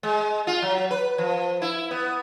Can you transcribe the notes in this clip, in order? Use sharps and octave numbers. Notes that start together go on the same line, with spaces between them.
G#3
F4
F#3
B4
F3
E4
B3